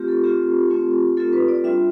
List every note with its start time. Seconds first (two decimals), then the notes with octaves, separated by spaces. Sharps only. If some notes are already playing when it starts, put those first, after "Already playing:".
Already playing: A3 C4 F4 G4
0.08 A4
0.24 A3 C4 F4 G4
0.70 A3 C4 F4
1.17 A3 C4 F4 A4
1.33 B4
1.49 D5
1.64 G3 D4 F4 E5